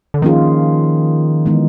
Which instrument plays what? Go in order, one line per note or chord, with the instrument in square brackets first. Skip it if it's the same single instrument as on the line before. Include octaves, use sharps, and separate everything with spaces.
[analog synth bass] D3
[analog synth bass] D#3 [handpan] F3 A#3 C#4 F4 G#4
[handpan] E3 G#3 B3 D#4